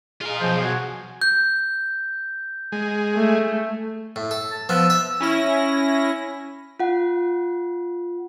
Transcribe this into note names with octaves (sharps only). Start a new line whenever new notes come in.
F4 G#4 A#4 D#5 F5
B1 F3 C5
F#4 G#5
G6
G#3
A3
A2
A4
A5
F3 B3 E6
E5
C#4 E4 A#6
F4 F#5